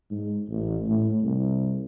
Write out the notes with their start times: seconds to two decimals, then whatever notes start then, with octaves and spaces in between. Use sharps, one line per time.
0.11 G#2
0.49 A1
0.88 A2
1.23 C2